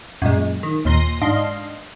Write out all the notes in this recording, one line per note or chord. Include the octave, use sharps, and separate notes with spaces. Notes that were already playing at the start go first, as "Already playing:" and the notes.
F#2 A#2 G#3
D#3
D#2 A#2 C6 A#6 D#7
G#2 D4 D#5 F5 C6